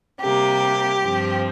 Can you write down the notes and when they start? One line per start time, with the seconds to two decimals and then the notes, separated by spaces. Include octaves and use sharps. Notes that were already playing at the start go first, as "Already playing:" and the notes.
0.20 C3 G3 A#3 G4
1.03 G2 F3 C4